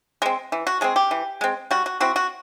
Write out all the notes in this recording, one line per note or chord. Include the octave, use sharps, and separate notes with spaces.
G#3 C4
E3
F#4
G#3 C4 G#4
G4
E3
G#3 C4
G3 F#4
F#4
C4 E4 F#4
F#4